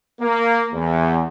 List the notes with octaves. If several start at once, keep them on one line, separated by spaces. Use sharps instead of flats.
A#3
E2